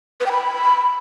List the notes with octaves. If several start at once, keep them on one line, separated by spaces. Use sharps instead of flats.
B4
G5
B5